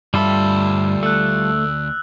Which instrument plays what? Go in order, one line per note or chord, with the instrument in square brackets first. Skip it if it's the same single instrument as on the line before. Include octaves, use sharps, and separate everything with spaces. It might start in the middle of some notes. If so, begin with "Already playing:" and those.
[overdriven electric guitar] D2 B5 [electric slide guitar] G2 E5 [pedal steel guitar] G3 F4 A4
[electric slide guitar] A3 [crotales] E6 F#6